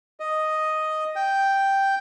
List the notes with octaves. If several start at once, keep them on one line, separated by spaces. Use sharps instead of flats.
D#5
G5